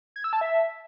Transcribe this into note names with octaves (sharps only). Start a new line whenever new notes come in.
G#6
E6
A5
E5